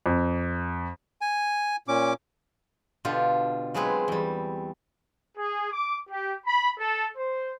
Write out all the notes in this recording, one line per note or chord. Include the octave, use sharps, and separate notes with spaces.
F2
G#5
A#2 C#4 D6
B2 D3 F4 G4
F#3 G#3 C4 G#4 B4
E2 G3
G#4
D6
G4
B5
A4
C5